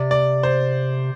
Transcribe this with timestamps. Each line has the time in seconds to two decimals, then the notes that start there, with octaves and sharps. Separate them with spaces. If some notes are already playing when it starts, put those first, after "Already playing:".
Already playing: C3 D5
0.11 D5
0.43 C5